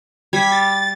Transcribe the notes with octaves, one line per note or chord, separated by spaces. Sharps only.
G3 G#6 B6
A6